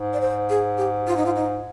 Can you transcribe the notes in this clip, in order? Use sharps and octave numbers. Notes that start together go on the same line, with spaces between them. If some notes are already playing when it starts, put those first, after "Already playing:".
Already playing: G#2
D5
C5
G#4
G4
F4
D#4
F4
D#4